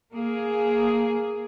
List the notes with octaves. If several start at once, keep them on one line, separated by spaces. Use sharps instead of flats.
A#3 G#4